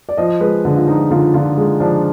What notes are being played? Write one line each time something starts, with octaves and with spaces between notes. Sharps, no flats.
D5
F3 D#5
G#3 B4
D3
F4
F3 D#4
D3 F4
D3 F4
G#3
F3 D4